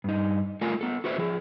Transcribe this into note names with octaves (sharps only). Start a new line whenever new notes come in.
G2 D#4
A3 F4 A4 A#4 F5 G#5
B3 A4
F#4 A4 B4 C5 D#5 E5
F3 G#4